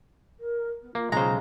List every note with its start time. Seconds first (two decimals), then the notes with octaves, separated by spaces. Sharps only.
0.40 A#4
0.82 B3
0.95 A#3 F4
1.12 B1 C#3 G#3 C5 A#5